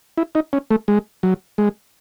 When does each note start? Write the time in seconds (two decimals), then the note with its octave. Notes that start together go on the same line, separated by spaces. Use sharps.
0.18 E4
0.35 D#4
0.53 C#4
0.71 A3
0.88 G#3
1.23 F#3
1.58 G#3